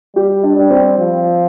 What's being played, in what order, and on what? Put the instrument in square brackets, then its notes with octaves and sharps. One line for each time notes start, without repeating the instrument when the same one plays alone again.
[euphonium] G3 [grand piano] G4
[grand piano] D4
[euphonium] G3
[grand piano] C4
[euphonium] F3